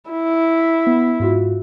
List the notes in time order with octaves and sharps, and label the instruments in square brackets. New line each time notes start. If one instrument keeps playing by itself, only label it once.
[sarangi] E4
[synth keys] B3
G#2 F4 F#4